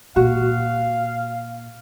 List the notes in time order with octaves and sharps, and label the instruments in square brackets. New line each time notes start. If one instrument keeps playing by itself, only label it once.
[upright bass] A#2 [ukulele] F#4 [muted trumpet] F5